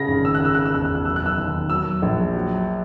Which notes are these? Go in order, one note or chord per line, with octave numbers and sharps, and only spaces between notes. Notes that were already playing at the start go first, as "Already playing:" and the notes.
Already playing: C#3 A#6
G#1
E6
F#6
C#3 E6
F#6
E6
E1 F#6
E6
F#6
F#3 E6
F#6
E6
D#2
F#3 E6
A#1
F#3